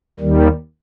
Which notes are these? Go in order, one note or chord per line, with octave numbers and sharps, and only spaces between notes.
D#2 D#3 G3